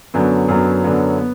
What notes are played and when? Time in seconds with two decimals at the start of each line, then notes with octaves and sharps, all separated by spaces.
0.14 F#2 D3 F#3 B3
0.48 F#2 D3 F#3 B3
0.84 F#2 D3 F#3 B3
1.18 B3